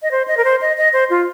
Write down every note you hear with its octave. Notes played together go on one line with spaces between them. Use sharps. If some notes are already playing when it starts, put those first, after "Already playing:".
D#5
C5
D#5
A#4
C5
D#5
D#5
C5
F4